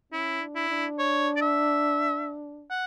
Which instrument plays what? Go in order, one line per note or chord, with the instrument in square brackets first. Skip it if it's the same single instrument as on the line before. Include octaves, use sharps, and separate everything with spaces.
[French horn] C#4 [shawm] E4
[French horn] D4
[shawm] E4
[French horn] D4
[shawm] C#5
D5
E5
F#5